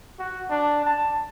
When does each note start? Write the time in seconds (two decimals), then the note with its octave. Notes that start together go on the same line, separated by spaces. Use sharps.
0.19 F#4
0.50 D4
0.85 A5